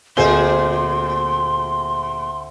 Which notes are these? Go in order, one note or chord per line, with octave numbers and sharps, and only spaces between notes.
D2 A#2 C4 G#4 C5 G#5 C6 G7